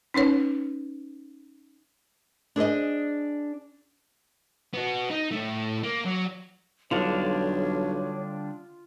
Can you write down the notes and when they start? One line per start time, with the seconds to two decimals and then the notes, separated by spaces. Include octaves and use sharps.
0.14 C#4 D#4 B4 C#5
2.56 D4 G#4 C5 D#5
4.73 B3 F#4
5.10 D#4
5.31 A2 A3
5.83 A#3
6.05 F#3
6.91 B1 D3 G3 D4 F4 C#5 D#6